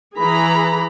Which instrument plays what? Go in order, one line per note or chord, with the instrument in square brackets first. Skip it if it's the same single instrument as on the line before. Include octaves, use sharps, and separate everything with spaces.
[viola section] E3 G#4 A#5 B5